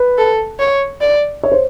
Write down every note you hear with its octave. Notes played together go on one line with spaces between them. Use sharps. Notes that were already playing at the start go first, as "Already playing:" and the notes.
Already playing: B4
A4
C#5
D5
C#5
C5